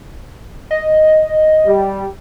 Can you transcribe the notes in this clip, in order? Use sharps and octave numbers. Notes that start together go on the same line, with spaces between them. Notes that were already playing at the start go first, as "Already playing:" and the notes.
D#5
G3